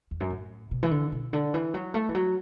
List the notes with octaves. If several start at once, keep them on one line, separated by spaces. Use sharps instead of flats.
E2
F#2
A2
B2
E3
D3
B2
D3
E3
F#3
A3
E3
F#3